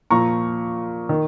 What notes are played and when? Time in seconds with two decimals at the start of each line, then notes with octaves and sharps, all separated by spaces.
0.10 A#2 F3 A#5 C#6
1.09 D#3